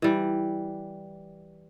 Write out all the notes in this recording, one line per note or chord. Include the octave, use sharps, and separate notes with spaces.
E3 G3